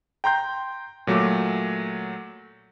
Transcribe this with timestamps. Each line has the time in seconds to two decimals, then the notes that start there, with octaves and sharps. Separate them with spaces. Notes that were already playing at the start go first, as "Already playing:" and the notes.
0.24 G5 A#5 C6 G6
1.07 A#2 F#3 A3 D6